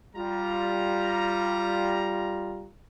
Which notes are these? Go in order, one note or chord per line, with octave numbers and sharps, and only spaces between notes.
G3 F4 A#5